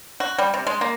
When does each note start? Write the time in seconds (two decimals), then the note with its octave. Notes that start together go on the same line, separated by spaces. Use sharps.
0.20 F#4
0.38 G3
0.54 C3
0.67 G#3
0.81 A#3